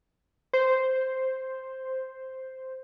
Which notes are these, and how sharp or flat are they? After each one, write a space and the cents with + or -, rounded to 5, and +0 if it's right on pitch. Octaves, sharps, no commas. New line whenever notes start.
C5 +0